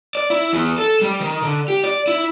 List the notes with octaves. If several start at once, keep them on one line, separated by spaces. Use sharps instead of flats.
D5
E4
E2
A4
G3
D#3
D3
G4
D5
E4